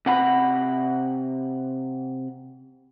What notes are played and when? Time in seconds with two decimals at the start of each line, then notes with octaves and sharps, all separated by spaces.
0.06 C3 F#5 B5